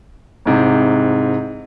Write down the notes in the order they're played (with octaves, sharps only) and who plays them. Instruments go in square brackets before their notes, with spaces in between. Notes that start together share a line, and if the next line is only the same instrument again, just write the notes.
[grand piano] C2 G#2 C3